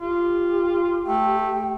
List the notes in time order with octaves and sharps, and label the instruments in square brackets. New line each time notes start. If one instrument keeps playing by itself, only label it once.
[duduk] F4 [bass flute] G4
[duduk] A3 [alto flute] G5